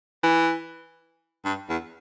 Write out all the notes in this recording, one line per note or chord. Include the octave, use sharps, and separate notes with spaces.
E3
G2
E2